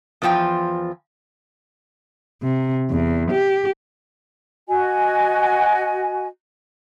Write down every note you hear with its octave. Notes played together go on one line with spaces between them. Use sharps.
E2 E3 F3 F4 G5
C3
E2
G4
F#4 D#5 G#5